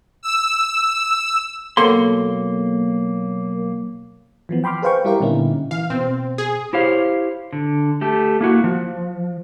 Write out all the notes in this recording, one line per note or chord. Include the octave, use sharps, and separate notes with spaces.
E6
B1 A#3 A4 A#4 C#5 C6
E3 F3 B3
G5 B5 C6 D6 F6
G#4 B4 C5 F5 G5 C#6
G3 E4 G4 A#4 F5
A#2 D3 B3 C#4 D#4 E4
E3 F5
B2 C4
G#4
E4 G4 C5 C#5 F5
D3
A3 G4 A5
A#3 E4 F#4
F3